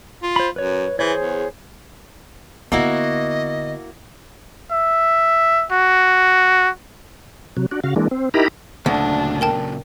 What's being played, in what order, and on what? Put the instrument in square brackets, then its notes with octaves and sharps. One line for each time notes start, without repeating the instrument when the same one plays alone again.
[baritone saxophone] F4
[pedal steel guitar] C5 B5
[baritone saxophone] F#2 [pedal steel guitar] B4 C#5
[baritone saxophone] E3 [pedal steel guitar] G#4 C5 C#5
[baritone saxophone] E2
[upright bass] D3 B3 [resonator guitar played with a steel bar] A#3 E4 F#4 [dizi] D#5
[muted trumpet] E5
F#4
[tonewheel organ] C3 F#3
D4 F#4
C#3 F#4 F5
E3 G#3 A#3 D4
C4
D#4 E4 G4 A#4 A#5 B5
[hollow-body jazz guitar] D2 [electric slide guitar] A#2 C#3 F#3 [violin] D4
[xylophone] A#4 G5 A5